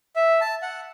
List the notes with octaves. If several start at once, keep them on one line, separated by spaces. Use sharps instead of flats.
E5
A5
F#5